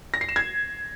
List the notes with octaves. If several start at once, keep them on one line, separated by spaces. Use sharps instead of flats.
A#6
C7
E7
G#6